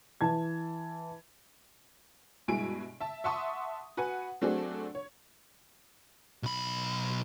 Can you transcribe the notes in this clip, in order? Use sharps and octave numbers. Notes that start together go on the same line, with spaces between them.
E3 A5 G#6
G2 B2 G#3 E4 G#5 D7
E5 A5
E5 F#5 A5 C6 C#6 D#6
F#4 B4 F#5 G#5
F#3 A3 C4 D4 F#4 G#4
C#5
B1 B5